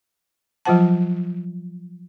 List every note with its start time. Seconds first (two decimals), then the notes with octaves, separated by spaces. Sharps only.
0.65 F3 F#3 F4 C5 F#5 A5